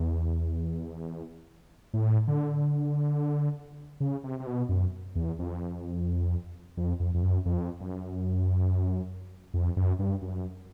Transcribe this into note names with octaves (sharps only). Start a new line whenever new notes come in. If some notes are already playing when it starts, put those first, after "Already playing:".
Already playing: E2
A2
D3
C#3
C3
C3
B2
F#2
E2
F2
F2
F2
F2
F#2
F2
F#2
F2
F#2
G2
F#2